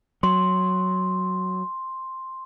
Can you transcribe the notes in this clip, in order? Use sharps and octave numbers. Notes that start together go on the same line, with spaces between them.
F#3 C6